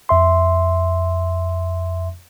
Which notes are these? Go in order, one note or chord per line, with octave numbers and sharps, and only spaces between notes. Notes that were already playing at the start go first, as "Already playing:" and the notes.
F2 E5 C6